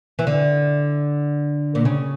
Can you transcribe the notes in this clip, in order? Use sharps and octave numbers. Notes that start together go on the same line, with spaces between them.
E3
D3
A#2
C#3